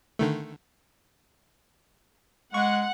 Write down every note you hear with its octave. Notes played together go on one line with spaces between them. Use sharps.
D3 D#3 A3
G#3 F#5 C#6